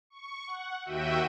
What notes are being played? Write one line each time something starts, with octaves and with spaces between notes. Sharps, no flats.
C#6
F#5
D#2 F#4 E5 G5 D#7